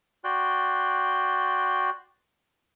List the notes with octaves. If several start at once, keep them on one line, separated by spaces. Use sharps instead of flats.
F#4 D5 G5 C6 F#6